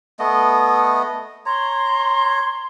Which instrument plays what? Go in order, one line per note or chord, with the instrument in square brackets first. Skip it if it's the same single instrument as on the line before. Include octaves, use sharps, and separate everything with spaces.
[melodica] A3 B3 D#5
[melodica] C#5 A#5 [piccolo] C6